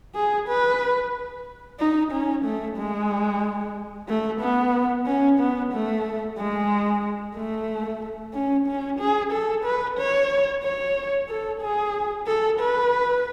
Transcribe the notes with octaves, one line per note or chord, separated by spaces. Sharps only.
G#4
B4
D#4
C#4
A3
G#3
A3
B3
C#4
B3
A3
G#3
A3
C#4
C#4
G#4
A4
B4
C#5
C#5
A4
G#4
A4
B4